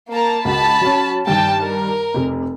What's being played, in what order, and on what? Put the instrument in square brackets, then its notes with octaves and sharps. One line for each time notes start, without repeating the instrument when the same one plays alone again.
[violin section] A#3 A5 A#5
[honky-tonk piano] C#2 F#4 [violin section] A5 B5
[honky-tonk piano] F#3 C#4
[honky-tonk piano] G2 D#3 [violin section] G5 A5
[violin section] A#4
[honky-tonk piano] F1 C3